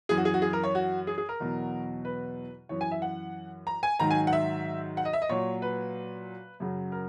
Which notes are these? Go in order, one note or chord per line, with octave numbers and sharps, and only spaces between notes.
F#2 E3 G#4
F#4
G#4
F#4
G#4
A#4
C#5
F#4
G#4
G#4
A#4
E2 B2 F#3
B4
F#2 E3 C#5
G#5
E5
F#5
A#5
G#5
G#2 D#3 F#3 A#5
G#5
F#5
E5
F#5
D#5
E5
D#5
A#2 F#3 C#5
B4
F#2 C#3 F#3
A#4